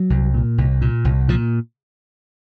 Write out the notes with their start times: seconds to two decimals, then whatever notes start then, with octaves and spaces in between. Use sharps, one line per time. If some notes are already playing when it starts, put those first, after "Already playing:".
Already playing: F#3
0.10 C2
0.34 A#2
0.58 C2
0.81 A#2
1.05 C2
1.29 A#2 F3